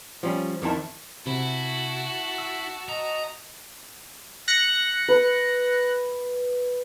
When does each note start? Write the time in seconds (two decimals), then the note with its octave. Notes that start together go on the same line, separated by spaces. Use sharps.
0.23 F3 G3 C#4
0.62 F2 D#3 E4 A5
1.27 C3 E4 F#4 A5
2.38 E6
2.88 D#5 A#5
4.48 F#6 A#6 C#7
5.08 B4